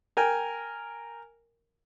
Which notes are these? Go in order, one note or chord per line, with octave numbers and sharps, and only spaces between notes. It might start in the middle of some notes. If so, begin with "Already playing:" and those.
A#4 G5 G#5